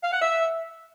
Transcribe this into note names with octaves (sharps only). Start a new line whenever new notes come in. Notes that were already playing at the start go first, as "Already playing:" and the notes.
F5
F#5
E5